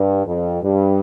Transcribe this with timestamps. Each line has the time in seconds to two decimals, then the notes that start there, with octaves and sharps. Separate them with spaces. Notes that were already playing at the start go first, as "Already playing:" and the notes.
Already playing: G2
0.26 F2
0.63 G2